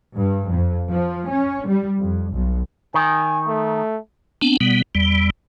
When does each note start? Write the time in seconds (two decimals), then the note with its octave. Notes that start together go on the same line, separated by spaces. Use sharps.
0.16 G2
0.50 F2
0.90 F3
1.31 C#4
1.68 G3
2.00 F2
2.32 B1
2.94 D#3 G#5
3.46 A3
4.42 B3 C4 D4
4.60 B2 G3 B3
4.95 E2 G3